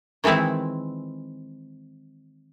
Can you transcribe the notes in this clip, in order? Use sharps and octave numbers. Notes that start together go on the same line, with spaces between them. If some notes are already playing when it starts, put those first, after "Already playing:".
D#3 E3 G#3 C4 E4